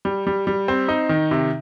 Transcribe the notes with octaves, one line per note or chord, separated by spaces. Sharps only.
G3
G3
G3
C4
D#4
D#3
C3